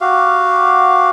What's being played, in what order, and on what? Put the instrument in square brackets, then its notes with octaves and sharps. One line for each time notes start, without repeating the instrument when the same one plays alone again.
[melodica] F#4 G4 F5